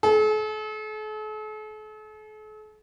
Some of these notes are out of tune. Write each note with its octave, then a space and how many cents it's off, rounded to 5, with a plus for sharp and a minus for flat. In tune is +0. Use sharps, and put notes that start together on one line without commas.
A4 -45